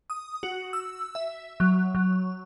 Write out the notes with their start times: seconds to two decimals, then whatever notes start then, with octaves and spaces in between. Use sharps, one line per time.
0.10 D#6
0.43 F#4
0.73 E6
1.15 E5
1.60 F#3
1.95 F#3